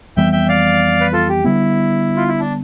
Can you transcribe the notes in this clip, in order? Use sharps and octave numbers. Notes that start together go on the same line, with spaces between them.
F2 E3 G3 B3 E5 G5
E5 G5
D5 F5
B4
F4 A4
G4
D3 G3 B3 E4
F4
E4
D4